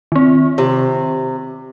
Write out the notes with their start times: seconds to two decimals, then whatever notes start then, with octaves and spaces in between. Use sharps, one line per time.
0.12 D#3 C4
0.58 C3